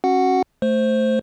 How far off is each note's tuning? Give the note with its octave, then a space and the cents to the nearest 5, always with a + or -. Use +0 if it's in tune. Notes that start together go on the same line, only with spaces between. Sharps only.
C#4 -30 F#4 +0 F#5 +0
A3 +0 C5 +0